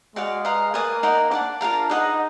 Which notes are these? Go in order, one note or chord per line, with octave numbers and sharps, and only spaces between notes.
G#3 F#4 D5 F5
B4 F5 A#5 D#6
A#3 B4 D5 G#5 D#6
D#4 A#4 D5 F#5
D4 D5 F#5 D6
F4 A#4 F5 A#5
D#4 G#4 B4 D#5 F#5